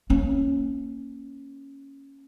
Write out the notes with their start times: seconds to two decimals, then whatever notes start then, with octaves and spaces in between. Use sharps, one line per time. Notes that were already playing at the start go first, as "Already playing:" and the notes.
0.10 A#3 C#4